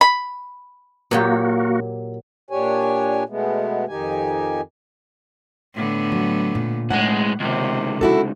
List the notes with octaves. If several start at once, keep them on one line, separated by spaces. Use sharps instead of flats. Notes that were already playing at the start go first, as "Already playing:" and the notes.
B5
A#2 F#3 A#3 F#4 G4
A#2 D4 G4 C#5 G#5
B2 G#3 A3 B3
F2 D#3 D#4 G4 G#5
A2 D3 B3
F#3
A#2
B1 A2 G#3 F#5
C#2 C3 D#3
E4 F#4 A4